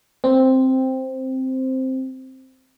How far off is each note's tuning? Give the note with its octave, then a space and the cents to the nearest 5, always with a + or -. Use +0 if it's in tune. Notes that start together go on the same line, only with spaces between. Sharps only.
C4 +0